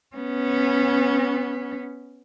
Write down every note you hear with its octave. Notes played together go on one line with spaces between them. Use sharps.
B3 C#4